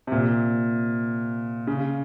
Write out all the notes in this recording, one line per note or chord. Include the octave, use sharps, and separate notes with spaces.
C3
A#2
C#3